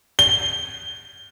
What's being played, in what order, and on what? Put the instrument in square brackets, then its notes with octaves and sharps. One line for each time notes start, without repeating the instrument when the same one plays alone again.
[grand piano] G7